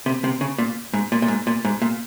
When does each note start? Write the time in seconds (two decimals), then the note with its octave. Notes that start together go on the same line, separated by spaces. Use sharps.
0.06 C3
0.24 C3
0.41 C#3
0.58 A#2
0.94 G#2
1.12 A#2
1.22 A#2
1.28 G#2
1.47 A#2
1.65 G#2
1.82 A#2